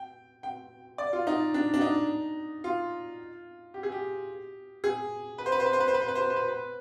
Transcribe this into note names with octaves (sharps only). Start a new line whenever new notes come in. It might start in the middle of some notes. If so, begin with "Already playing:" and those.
Already playing: G5
G5
D5
F4
D#4
D4
D4
D#4
F4
G4
G#4
G4
G#4
B4
C5
B4
C5
B4
C5
B4
C5
B4
C5
B4
C5
B4
C5
B4
B4